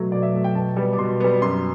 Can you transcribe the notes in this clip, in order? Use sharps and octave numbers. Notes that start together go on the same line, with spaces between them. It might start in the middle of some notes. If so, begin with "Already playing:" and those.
Already playing: B2 F#3 A3
B2 D5
E5
F#3 A3
G5
B2 A5
G3 B3
D6
B2 C6
G3 B3
F#2 C6